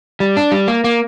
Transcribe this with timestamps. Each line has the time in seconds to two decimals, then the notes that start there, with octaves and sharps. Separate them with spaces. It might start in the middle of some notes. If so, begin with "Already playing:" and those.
0.20 G3
0.37 D4
0.52 G3
0.68 A#3
0.84 A#3